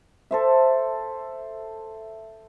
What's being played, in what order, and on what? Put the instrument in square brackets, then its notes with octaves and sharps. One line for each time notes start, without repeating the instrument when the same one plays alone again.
[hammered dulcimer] A4 C5 E5